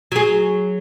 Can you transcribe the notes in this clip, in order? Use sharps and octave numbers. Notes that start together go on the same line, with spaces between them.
F#3 G#4